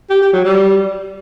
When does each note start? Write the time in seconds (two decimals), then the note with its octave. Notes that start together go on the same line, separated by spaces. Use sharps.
0.10 G4
0.22 G4
0.33 F#3
0.45 G3